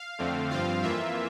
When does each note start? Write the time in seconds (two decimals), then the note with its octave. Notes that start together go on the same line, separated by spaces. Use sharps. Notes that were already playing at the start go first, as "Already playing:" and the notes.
Already playing: F5
0.18 F2 D3 A3 C4
0.50 G2 F3 C4 F4 F5
0.83 F2 E3 A#3 F4 E5